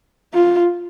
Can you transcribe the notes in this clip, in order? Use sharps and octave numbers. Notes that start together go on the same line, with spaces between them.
F4